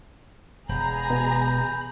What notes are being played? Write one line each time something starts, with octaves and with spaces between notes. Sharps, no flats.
E1 G#4 A#5 B5 G6
B2